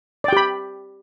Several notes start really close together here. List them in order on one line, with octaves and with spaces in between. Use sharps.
D5 G5 G4 B5